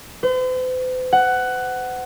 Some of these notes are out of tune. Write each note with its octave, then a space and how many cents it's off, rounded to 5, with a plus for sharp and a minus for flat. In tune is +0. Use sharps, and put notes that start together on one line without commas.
C5 -45
F#5 +10